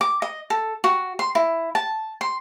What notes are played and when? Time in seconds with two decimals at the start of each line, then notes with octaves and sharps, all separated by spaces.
0.01 D6
0.22 D#5
0.50 A4
0.84 F#4
1.19 C6
1.35 E4
1.75 A5
2.21 C6